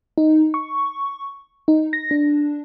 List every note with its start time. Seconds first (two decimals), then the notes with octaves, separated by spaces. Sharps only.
0.18 D#4
0.54 C#6
1.68 D#4
1.93 A#6
2.11 D4